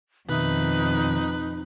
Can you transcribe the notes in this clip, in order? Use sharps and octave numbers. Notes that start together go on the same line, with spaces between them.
F2 B2 D#3 D#4 B4 E5